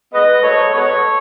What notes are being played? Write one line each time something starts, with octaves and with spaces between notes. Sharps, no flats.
A2 G#3 B3 B4 D#5
G#2 F#3 A3 A4 C#5
B2 G#3 B3 A4 C#5